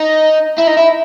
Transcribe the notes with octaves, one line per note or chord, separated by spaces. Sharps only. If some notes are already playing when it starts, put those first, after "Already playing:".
Already playing: D#4
E4
D#4
E4